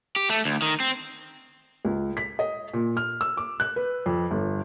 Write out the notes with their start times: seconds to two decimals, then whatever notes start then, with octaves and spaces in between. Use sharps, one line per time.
0.16 G4
0.30 A3
0.45 D2
0.62 D#3
0.80 C4
1.85 C#2
2.17 B6
2.39 D#5
2.74 A#2
2.97 F6
3.21 E6
3.37 D6
3.60 F#6
3.76 B4
4.06 F2
4.31 G1